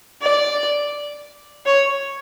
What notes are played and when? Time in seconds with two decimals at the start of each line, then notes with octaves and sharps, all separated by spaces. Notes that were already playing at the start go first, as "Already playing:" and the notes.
0.22 D5
1.66 C#5